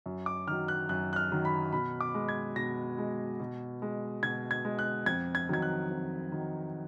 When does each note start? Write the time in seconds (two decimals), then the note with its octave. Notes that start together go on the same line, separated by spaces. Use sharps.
0.06 F#2
0.26 D6
0.47 D#3 F#3 F6
0.68 F#6
0.89 F#2 F#6
1.13 F#6
1.16 F6
1.31 D#3 F#3
1.45 B5
1.73 B2 B5
2.01 D6
2.14 G#3
2.29 G#6
2.56 B2 A#6
2.98 G#3
3.40 B2
3.82 G#3
4.23 B2 G#6
4.51 G#6
4.65 G#3
4.79 F#6
5.06 F2 G#6
5.35 G#6
5.49 D#3 F#3 G#6
5.62 F#6
5.90 F2
6.32 D#3 F#3